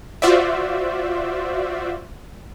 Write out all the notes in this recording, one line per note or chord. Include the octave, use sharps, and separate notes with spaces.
F4 F#4 C5 D5 E5